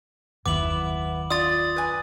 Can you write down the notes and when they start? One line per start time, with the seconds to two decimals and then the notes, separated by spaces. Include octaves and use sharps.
0.46 F#1 D#2 B3 E4 D6 F#7
1.30 F4 D5 D#6 A6
1.76 B4 G#5